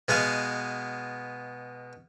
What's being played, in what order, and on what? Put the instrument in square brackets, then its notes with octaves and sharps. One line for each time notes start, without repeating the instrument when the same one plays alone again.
[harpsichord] B2 G#3 B3 F5 G#5